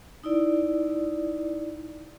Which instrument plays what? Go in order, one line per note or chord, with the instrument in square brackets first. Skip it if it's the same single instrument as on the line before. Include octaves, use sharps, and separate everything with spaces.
[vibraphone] D#4 E4 D5